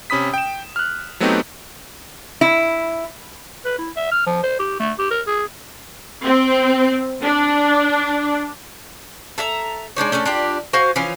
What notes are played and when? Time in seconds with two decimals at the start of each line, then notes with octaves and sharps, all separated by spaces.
0.10 C3 C#4 B5 D#6 B6
0.34 G5 E7
0.76 F6 F#6
1.20 F#3 A3 B3 C4 D#4 G4
2.41 E4
3.65 B4
3.79 E4
3.96 E5
4.12 F6
4.27 F3
4.43 C5
4.59 G4
4.80 A3
4.99 G4
5.11 A#4
5.27 G#4
6.24 C4
7.23 D4
9.38 A4 E5 A#5
9.96 G#3 D4 D#4 C#5
10.12 A3 C#4 D4 A4
10.25 D4 F4 G4
10.73 F#4 C5 F5 G#5
10.96 E3 F3 C#4 F4